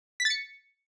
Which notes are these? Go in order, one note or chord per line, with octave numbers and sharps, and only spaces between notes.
B6
A6
C#7